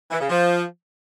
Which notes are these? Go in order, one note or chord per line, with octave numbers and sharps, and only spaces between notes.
E3
C#3
F3